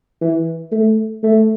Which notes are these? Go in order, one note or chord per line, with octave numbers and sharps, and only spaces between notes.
E3
A3
A3